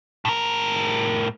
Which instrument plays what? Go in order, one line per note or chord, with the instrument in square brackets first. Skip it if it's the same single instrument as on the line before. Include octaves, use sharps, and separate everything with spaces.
[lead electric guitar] A2 A#4